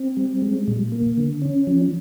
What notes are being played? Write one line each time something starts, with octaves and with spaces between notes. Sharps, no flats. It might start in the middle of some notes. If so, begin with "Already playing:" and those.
Already playing: C4
G3
G#3
A#2
A#3
D3
C#4
F3